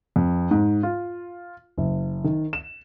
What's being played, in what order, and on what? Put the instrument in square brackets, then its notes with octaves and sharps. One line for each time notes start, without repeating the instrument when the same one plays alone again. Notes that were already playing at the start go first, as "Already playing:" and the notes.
[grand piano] F2
G#2
F4
F#1
D#3
E7